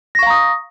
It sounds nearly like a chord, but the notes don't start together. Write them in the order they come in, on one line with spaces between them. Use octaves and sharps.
A#6 C#6 F5 A#5 D#6